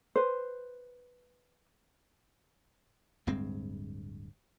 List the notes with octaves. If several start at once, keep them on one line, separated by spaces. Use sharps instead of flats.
B4 C5
D1 G2 G#3 C4